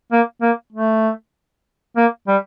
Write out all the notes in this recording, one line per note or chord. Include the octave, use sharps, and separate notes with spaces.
A#3
A#3
A3
A#3
G3